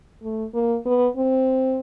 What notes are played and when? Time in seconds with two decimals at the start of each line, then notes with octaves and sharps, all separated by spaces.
0.23 A3
0.54 A#3
0.86 B3
1.17 C4